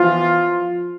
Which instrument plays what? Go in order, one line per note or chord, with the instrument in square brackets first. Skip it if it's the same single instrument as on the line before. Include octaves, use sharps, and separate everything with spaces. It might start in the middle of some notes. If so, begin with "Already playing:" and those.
Already playing: [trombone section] E3 F3 B3 F4